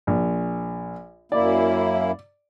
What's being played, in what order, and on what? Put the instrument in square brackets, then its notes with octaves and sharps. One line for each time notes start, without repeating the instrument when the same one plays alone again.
[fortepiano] A#1
[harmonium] F#2 A#3 E4 [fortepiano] D5